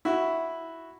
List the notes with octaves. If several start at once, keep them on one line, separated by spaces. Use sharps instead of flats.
E4 F#4